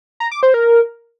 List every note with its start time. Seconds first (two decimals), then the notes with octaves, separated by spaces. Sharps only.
0.20 A#5
0.32 D6
0.43 C5
0.54 A#4